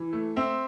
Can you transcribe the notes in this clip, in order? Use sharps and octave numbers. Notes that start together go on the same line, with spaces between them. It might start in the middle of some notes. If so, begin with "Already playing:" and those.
Already playing: E3
A3
C4 E5